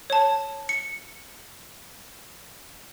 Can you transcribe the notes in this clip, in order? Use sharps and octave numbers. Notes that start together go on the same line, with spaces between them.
C#5 A5
C#7